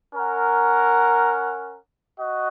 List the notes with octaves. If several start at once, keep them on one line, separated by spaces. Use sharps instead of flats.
C#4 A#4 F#5
F#4 D#5